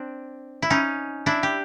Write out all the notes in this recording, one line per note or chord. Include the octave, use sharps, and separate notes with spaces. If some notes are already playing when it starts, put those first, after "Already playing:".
Already playing: C4 D4
E4
C#4 D#4
D4 E4
G4